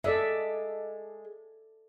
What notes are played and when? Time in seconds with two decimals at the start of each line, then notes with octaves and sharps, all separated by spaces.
0.04 G#3 A4 D5 E5